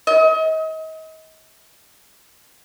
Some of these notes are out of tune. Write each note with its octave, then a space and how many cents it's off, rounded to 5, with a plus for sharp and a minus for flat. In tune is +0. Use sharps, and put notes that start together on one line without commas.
D#5 +35